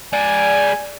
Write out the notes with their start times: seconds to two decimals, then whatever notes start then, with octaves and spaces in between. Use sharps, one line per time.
0.13 G#3 D5 G#5